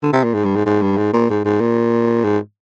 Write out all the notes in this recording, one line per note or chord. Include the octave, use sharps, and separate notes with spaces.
D3
C3
A#2
G#2
G2
G#2
G#2
G2
G#2
A#2
G#2
G#2
A#2
G#2